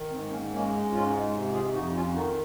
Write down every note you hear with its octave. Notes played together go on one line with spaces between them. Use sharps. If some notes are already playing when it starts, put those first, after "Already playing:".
Already playing: D#3
G#2 C4
A#3 C#4
G#3 A#3 C#4
G#2 C#4 F4
C3
F4 G#4
F2 D#4 F#4
C#4 F4
D#3 D#4 F#4